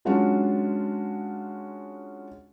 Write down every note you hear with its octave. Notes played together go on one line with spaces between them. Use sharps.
F#3 G#3 C#4 D4 F4 F#4